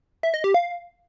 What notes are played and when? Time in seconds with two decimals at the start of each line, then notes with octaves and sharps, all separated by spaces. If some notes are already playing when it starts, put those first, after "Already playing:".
0.23 E5
0.34 D#5
0.44 G4
0.54 F5